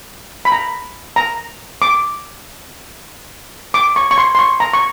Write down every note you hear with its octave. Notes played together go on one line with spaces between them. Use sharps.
B5
A#5
A#5
D6
D6
C#6
C#6
C6
C6
C#6
A#5
C#6